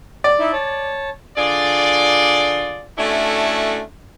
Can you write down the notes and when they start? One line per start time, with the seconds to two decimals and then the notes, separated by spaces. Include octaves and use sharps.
0.24 D5
0.39 D#4 E4 E5
0.53 C#5 A5
1.37 D3 F4 G#4 D5
2.98 A3 C#4 D4 E4 F#4 A4